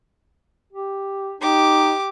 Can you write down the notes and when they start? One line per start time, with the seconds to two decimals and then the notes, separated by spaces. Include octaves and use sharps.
0.73 G4
1.41 D#4 G4 D6